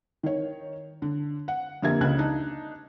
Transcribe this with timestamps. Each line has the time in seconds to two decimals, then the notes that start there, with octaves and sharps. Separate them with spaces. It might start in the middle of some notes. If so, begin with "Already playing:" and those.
0.23 D#3 C#5
1.02 D3
1.48 F#5
1.82 F2 D3 A#3 G4 E5 G#6
2.01 C#2 C#3 F#6 G#6
2.18 D4 D#4